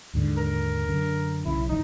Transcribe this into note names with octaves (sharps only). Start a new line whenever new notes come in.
D#2 G#2 D3
A#4
F#2 D3
B1 C#3 E4
F#1 E3 D#4